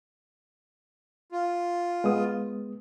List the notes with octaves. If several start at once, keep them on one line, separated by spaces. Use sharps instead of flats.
F4
G#3 B3 D#6